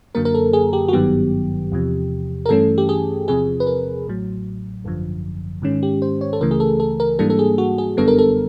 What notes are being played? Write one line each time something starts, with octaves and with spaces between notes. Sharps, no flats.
F#2 D3 F#3 A#3 A#4
A#4
A4
G#4
G4
F#4
G#1 G2 D#3 F#3 B3 G4
E2 C3 F3
A#4
G2 E3 A3 C#4 A4
G4
G#4
E2 C3 F3 G#4
B4
A#4
A1 A2 F#3
G#1 F#2 D3 F3
G#2 D#3 G#3 C#4
G4
C5
C#5
A4
C#2 C#3 E3 A3 A#4
G#4
A4
A4
A#4
G#2 E3 G3 A#3 D4 A4
A4
G#4
F#4
G#4
G1 F#2 D3 G3 B3 A4
A#4
A4